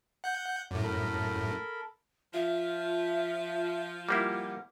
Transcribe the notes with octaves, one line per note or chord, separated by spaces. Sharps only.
F#5 G6
F#2 A2 D5
A4 A#4 B5
F3 F4 E5
G3 A#3 E4 F#5